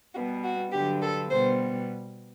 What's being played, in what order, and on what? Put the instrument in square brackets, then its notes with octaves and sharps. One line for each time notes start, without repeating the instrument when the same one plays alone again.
[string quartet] B2 G3 B3 F#4
F#4
G2 D3 F#3 G4
A4
B2 G3 B3 C5